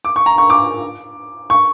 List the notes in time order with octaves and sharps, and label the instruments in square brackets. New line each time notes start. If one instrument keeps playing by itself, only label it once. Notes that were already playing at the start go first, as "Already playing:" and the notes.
[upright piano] D6
C#6
A#5
C#6
D6
C#6